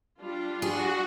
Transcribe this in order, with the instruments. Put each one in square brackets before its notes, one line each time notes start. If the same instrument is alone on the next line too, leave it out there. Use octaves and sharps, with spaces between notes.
[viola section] G3 D4 F4
[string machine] F#4 [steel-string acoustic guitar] G#4